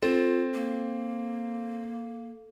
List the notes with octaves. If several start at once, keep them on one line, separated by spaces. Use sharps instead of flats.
C4 F4 A4
A#3